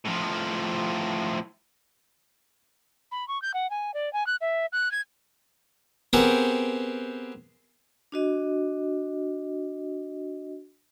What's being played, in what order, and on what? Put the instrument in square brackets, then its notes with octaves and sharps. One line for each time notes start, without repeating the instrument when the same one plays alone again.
[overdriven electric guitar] A2 F3
[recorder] B5
C#6
G6
F#5
G#5
D5
G#5
F#6
E5
F#6
G#6
[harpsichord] B3 C4 G4 G#4 A#4
[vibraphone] D4 F#4 D#5